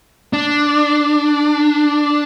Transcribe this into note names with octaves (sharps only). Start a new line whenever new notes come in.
D4